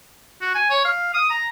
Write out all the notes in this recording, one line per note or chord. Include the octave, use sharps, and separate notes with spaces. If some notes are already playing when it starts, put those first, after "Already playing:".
F#4
G#5
C#5
F5
D#6
A#5